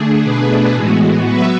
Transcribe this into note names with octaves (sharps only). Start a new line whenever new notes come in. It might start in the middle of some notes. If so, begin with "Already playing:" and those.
Already playing: D3 A3 D4 G#4
B2 A3 D4 G#4 B4
A2 E3 G#3 B3 F#4
F#3 B3 F#4 B4 E5